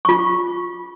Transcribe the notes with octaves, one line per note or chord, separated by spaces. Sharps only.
F4 C#6